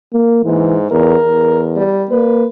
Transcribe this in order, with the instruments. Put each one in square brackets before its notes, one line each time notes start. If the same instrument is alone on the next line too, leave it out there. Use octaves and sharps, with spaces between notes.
[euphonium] A#3
[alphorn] G#2 [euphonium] E3
[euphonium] E2 [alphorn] A#4
[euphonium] E2
[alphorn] G3
[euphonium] A#3 [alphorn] B4